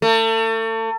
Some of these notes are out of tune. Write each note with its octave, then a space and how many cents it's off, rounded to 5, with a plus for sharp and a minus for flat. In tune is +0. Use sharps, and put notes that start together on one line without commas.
A3 +35